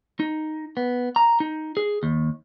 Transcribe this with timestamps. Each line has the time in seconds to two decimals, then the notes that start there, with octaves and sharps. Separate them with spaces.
0.20 D#4
0.77 B3
1.16 A#5
1.40 D#4
1.77 G#4
2.03 D#2